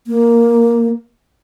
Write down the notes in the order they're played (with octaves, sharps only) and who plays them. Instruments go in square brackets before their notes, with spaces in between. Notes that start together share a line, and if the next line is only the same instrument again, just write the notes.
[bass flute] A#3